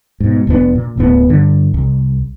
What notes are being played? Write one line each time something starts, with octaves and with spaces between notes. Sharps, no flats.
G#2 B2
F1 F2 B3 D4
A#2
D1 A2 B3
G2 D3
C2